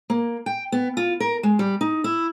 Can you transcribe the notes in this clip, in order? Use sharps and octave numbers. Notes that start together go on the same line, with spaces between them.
A#3
G5
B3
F4
A#4
G#3
G3
D#4
E4